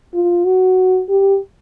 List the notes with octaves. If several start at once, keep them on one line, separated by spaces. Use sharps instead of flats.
F4
F#4
G4